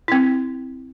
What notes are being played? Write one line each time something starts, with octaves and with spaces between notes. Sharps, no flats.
C4 E4